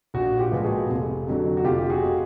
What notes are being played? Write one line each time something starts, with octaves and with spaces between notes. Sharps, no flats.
A#1 F#4
F4 G4
A#2 F3 G#3 B3
F#4 G#4
F1
F2 D3 F#3
F#4
F1 F4 G4
G4
F#4 G#4
B2